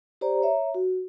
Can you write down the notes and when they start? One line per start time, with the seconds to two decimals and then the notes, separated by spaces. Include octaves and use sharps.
0.21 G4 C5 D5 A#5
0.42 C#5 E5 A#5
0.74 F#4